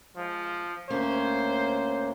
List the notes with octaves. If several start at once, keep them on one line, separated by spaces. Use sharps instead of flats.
F3 G#3
D2 A#3 C#4 C5